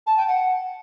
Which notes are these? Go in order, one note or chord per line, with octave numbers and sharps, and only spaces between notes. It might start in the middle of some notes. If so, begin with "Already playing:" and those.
A5
G5
F#5